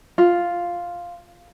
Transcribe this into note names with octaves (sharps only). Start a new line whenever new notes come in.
F4